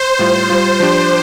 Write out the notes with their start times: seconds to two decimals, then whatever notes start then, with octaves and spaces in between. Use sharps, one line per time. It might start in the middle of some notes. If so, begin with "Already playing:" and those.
Already playing: C5
0.19 A2 G3 F4
0.50 G3 F4
0.80 F3 D4 G4